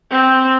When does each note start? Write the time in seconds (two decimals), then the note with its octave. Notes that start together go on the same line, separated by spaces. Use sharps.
0.11 C4